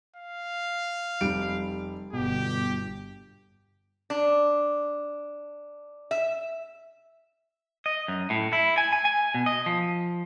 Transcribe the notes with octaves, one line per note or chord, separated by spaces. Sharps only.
F5
F1 G3 D7
G1 G2 B2 G4
D4
E5
D#5
F#2
A2
E4
G#5
G#5
G#5
B2
D#5
F3